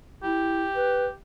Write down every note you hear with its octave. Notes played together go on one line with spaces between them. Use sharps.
E4 G4
B4